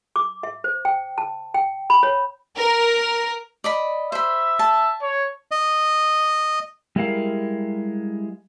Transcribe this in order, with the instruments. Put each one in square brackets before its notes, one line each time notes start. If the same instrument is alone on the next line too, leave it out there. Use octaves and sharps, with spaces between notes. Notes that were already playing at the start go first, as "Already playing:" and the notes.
[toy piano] D6
E5
C5
G5
A5
G5
B5
C#5
[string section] A#4
[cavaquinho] D5 D#5 B5
[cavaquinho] C5 B5 [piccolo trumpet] E5
[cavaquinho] A5
[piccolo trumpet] C#5
[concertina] D#5
[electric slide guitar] G3 G#3 E4 A#4 F5